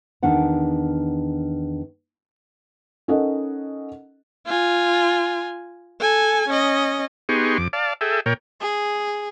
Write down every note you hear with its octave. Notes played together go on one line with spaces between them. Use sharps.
E2 D#3 D4 F#5 A5
C#4 D#4 A4 A#4 D#5 F#5
F4 G#5
A4 G#5
C#4 D#5
B3 D#4 G4 G#4 C6 C#6
F2 D6
D5 F5 A5
G#4 A4 E5 G5
A#2 A#4 C#5 G5
G#4